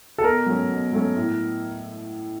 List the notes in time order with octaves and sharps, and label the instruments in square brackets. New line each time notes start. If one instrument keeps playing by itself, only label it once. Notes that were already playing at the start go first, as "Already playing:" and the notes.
[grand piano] A4
[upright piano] B2 [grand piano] A#4
[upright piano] F#3 A3 C#4
B2
F#3 A3 C#4
A2